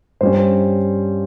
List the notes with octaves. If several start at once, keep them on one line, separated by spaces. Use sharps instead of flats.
G2 G3 C#4 C5